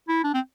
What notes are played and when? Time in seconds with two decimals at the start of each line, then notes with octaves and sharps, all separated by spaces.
0.08 E4
0.24 D4
0.34 C4